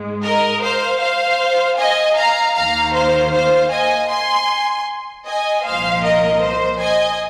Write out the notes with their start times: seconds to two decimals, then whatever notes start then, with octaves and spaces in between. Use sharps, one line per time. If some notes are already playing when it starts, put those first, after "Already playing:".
Already playing: G#2 G#3
0.24 A#4 D#5
0.63 C5 F5
1.01 C5 F5
1.78 D#5 G#5
2.17 F5 A#5
2.55 D#2 D#3 A#3 F5 A#5
2.94 C5 F5
3.33 C5 F5
3.72 D#5 G#5
4.10 G#5 C6
5.26 D#5 G#5
5.65 C2 A#2 F3 A#3 C5 F5
6.04 A#4 D#5
6.43 C5
6.81 D#5 G#5